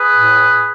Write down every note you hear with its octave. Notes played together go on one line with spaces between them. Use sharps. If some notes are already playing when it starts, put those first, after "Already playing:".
Already playing: G#4 B4
A2